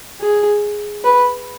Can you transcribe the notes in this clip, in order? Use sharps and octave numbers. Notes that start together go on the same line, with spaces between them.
G#4
B4